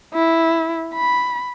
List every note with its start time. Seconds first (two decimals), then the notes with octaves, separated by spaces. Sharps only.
0.14 E4
0.95 B5